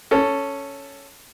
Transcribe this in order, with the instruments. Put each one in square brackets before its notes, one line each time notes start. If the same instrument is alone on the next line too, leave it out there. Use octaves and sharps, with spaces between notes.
[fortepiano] C#4 A4